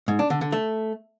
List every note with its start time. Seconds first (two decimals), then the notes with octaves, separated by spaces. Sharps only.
0.08 G#2
0.19 D4
0.30 D3
0.41 D3
0.52 A3